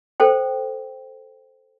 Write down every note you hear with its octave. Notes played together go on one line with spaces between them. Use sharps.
A4 C5 G5